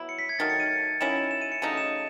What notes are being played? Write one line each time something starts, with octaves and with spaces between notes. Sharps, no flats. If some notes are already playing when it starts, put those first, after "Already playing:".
Already playing: F#3 B3 E4
C#7
B6
G#6
D#3 F#3 A3 A6
C#7
D#7
D#3 F#3 C#4 E4 E7
E7
E7
D#7
C#7
C#3 F#3 A3 D#4 D#7
E7